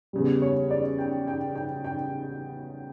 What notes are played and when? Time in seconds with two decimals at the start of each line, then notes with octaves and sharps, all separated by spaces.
0.13 E2 C#3 G3
0.42 C#5
0.71 D5
0.98 G5
1.28 G5
1.55 G5
1.84 G5